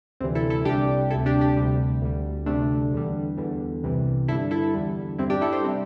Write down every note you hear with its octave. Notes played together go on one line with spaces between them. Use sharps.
D2 C3 E3 G3 C4
E4 A4
E4 A4
C2 C3 G3 D4 G4
D2 C3 G3 E4 A4
D4 G4
D4 G4
D2 C3 G3
D2 D3 G3
D2 C3 G3 A3 D4
E2 D3 G3
E2 D3 G3
C2 C3 E3 G3
G2 D3 G3 E4 A4
E4 A4
E2 D3 G3
G2 G3 C4 E4
D4 G4
E4 A4
G4 C5
C3 G3 C4